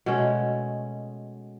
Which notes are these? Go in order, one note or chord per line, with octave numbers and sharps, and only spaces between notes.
B2 G#3 A3 C#4